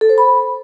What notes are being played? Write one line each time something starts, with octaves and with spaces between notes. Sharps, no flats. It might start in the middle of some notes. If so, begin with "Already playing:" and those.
A4
C5
B5